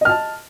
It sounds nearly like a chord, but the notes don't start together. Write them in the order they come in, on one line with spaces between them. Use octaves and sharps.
D#5 F6 A5